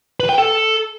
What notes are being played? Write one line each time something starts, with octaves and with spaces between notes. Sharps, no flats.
B4
G5
A4